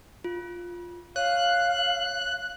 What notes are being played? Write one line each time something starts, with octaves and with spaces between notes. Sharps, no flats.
F4
C#5 F5 F#6